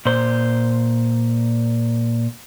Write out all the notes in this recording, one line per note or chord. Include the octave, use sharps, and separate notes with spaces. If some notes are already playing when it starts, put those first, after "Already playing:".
A#2 C5